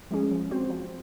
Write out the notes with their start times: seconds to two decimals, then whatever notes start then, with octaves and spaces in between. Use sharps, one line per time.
0.11 F3 G#3 C#4 G#4
0.31 F3
0.51 C4 F#4 C5
0.70 F3